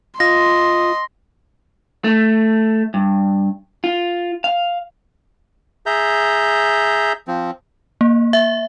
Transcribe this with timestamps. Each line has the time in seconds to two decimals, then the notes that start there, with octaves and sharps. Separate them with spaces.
0.20 F4 D#5 C6 A#6
2.04 A3
2.94 G2
3.84 F4
4.44 F5
5.86 G#4 E5 A#5 G6
7.28 F3 C4
8.01 A#3
8.33 E5